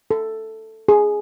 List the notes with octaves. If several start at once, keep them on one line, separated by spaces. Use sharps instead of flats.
A4
G#4